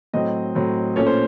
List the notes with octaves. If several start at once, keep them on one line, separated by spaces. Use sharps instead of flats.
A2 F#3 C4 D#5
A2 F#3 C4
A#2 A3 C#4 C#5
C5